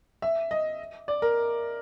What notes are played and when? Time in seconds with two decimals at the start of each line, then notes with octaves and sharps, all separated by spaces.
0.22 E5
0.51 D#5
1.08 D5
1.22 A#4